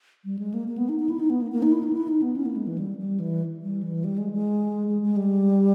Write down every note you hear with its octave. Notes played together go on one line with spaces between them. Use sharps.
G3
G#3
A#3
A#3
B3
D#4
D#4
E4
D#4
B3
A#3
A#3
D#4
E4
D#4
E4
D#4
B3
C#4
A#3
G#3
E3
G3
G3
E3
G3
E3
G3
G#3
G#3
G#3
G#3
G3